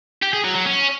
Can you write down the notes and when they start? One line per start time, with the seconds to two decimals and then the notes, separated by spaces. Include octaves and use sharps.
0.22 G4
0.33 G#4
0.44 F#3
0.55 F#3
0.66 C#4